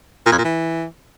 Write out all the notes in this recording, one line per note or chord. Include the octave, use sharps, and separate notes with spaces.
A#2
F2
A#2
E3